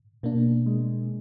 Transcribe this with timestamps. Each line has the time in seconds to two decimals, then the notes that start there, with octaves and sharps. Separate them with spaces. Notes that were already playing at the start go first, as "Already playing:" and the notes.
0.23 B2 A#3 D4
0.66 G#3